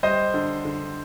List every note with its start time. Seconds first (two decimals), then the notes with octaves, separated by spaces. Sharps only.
0.03 G3 C5 D#5
0.34 D3
0.65 D3